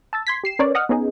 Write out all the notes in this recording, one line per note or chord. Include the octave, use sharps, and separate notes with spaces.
A5 E6 A6
C6 G#6 B6
G4 C7 E7
C#4 A#4 B4 C#5 D5
D#5 F#5 D#6 F6
B3 C#4 D#4 G#4